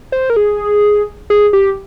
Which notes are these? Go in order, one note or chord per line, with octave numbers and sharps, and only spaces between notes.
C5
A#4
G#4
G#4
G4